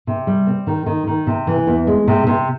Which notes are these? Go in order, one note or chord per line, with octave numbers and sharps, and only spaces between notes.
C3
G3
C4
D#3
D#3
D#3
C3
E3
E2
G#3
C3
C3